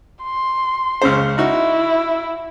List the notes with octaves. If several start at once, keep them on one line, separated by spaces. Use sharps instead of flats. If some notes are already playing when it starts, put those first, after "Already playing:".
C6
C#2 C#3 C5
D#4 E4 F#4